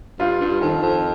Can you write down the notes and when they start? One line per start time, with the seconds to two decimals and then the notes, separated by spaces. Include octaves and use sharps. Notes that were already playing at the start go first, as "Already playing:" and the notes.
0.19 G2 F4
0.41 G2
0.61 F2 D#3
0.82 F2